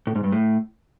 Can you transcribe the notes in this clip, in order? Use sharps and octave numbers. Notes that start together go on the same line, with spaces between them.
A2
G#2
G2
A2